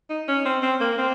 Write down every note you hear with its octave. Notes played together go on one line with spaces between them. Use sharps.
D#4
C#4
C4
C4
A#3
C4